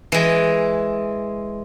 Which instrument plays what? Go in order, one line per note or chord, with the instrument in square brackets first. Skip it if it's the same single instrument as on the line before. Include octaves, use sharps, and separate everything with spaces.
[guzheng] E3 G#3